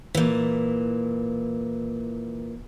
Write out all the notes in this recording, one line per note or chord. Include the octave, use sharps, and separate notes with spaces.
A#2 E3